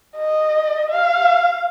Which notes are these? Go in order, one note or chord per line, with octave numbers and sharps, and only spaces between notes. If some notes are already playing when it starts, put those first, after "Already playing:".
D#5
F5